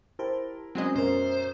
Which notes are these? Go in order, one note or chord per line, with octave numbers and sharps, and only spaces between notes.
E4 G4 A#4 C5 A5
F#3 G#3 C4 C#4 D#5
F#2 B2 C#4 A#4 C5